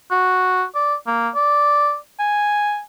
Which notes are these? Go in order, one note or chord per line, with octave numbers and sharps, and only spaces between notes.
F#4
D5
A#3
D5
G#5